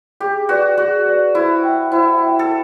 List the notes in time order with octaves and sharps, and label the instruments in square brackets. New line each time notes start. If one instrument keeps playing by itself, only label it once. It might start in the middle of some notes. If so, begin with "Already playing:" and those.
[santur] G4 [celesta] G#4
[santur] F#4 [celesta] B4 D5
[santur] F#4 [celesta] G#4
[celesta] B4 D5
[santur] E4 [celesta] C5
[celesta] E5 G5
[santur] E4 [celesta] C5
[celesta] E5 G5
[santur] A4